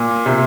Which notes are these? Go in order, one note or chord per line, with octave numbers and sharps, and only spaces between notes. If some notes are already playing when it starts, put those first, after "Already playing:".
Already playing: A#2
C3